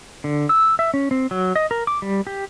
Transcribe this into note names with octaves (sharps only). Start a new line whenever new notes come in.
D3
E6
E5
C#4
C4
F#3
D#5
A#4
D6
G3
G4